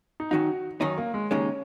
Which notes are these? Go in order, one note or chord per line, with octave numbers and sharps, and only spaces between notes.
D#4
F#2 D#3 F#3 D#4 F#4
F#2 D#3 F#3 C#4 D#4
A#3
G#3
D#2 C#3 G#3 C#4 D#4